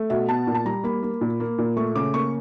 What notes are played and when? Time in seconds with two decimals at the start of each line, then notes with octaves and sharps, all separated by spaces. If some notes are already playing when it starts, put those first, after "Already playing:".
Already playing: A3
0.10 B2 E5
0.28 B3 A5
0.47 A#2
0.54 A5
0.65 G3 A#5
0.84 A#3 B5
1.03 A#3
1.21 A#2
1.40 A#3
1.58 A#2
1.77 A3 C#6
1.95 C#3 D6
2.14 A#3 C#6